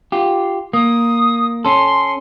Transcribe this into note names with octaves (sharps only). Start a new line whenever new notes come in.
F4 G4
A#3 D#6
C#4 A4 C6